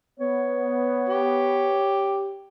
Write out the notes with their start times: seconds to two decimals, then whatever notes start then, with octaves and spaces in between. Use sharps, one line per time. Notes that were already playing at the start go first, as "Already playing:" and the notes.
0.20 B3 C#5
1.09 G4